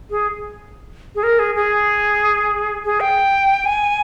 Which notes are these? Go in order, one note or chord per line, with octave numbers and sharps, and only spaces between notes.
G#4
G#4
A#4
G#4
G#4
G#4
G5
G#5